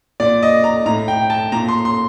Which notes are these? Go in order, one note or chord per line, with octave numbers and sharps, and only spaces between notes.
A#2 D5
D#5
A#5
A2 A#5
G5
A5
A#2 A#5
C6
C6